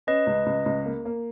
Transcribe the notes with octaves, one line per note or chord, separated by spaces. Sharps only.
C#4 B4 D#5
C#2
C#2
C#2
A#3
A#3